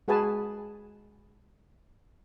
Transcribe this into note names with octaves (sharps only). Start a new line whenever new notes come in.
G#3 F#4 G#4 B4 G#5 A5